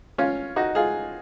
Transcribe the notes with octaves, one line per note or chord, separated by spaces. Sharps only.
C#4 F4
D#4 F#4
F4 G#4